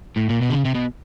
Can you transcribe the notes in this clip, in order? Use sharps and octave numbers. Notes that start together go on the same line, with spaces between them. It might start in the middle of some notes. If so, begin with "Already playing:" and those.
A2
A#2
B2
D3
C#3
C3
B2